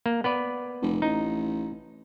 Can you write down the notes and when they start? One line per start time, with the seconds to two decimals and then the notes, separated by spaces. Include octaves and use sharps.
0.06 A#3
0.24 B3 B4 D5
0.82 F1
1.02 A1 D#4